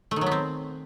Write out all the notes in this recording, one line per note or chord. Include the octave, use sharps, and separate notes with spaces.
A3
D#3
F#3
B3
C4